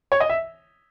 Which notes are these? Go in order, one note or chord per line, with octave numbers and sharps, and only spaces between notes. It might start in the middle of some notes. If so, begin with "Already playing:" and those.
C#5
D#5
E5